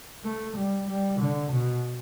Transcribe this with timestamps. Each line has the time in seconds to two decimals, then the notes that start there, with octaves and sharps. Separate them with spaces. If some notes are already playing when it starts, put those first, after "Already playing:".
0.24 A3
0.57 G3
0.88 G3
1.20 D3
1.52 B2